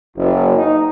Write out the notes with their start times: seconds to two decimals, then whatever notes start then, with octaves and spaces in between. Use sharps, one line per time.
0.16 F#1
0.56 D#4